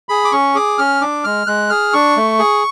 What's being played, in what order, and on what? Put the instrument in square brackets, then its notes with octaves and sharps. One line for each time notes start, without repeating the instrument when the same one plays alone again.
[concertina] G#4 B5
D6
C#4 C#6
G#4 D6
C#4 F6
D4 D6
G#3 F6
G#3 F#6
G#4 F6
D4 C#6
A3
G#4